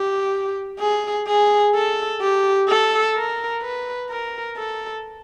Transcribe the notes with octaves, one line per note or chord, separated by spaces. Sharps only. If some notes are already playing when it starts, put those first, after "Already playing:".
Already playing: G4
G#4
G#4
A4
G4
A4
A#4
B4
A#4
A4